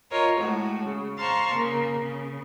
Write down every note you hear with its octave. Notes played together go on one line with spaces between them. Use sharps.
F4 A#4 C#5 D#5
A2 G#3 F#4
C#3
C5 F5 A5 A#5 C6 C#6
C#3 A#3
C#3